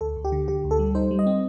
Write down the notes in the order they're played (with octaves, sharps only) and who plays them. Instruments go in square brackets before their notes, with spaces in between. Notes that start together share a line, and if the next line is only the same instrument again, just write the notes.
[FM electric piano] D2 A4
D2
G4
D3
D3 G4
D2
A4
G3
D#4 C5
G3
D#5
C4